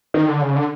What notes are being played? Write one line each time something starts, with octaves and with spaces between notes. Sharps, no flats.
D#3
D3
C#3
D3